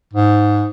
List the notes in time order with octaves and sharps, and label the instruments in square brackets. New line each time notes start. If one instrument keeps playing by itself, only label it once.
[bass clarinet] G#2